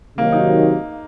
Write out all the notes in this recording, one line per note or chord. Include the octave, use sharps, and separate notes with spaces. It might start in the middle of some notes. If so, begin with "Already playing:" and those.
C3 D#3 F#3 A#3
D#4